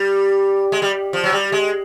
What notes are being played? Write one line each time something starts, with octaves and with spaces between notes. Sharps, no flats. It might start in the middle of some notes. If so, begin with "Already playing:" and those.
Already playing: G3
G#3
G3
F3
F#3
G3
G#3